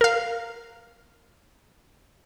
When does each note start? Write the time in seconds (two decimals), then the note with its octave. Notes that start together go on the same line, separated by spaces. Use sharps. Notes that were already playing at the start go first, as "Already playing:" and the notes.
0.01 A#4 F5